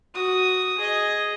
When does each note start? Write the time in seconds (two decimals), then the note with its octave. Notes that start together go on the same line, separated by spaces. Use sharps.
0.14 F#4 D#6
0.78 G#4 D#5